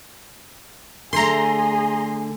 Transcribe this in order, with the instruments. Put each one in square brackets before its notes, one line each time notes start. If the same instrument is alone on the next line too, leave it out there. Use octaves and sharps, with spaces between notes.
[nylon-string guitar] D3 A3 [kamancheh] G#4 [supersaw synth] A#5 C6